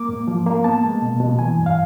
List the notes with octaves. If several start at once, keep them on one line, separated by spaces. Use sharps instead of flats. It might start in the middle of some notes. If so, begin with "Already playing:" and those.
Already playing: A#3 D6
G#2
F3
A#3
B3 A5
G#3
B2
B2
E3 G#5
G2
F5